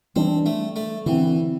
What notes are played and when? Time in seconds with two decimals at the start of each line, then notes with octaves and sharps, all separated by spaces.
0.16 E3 G3 C4 D4
0.46 A3
0.76 A3
1.06 D3 E3 C4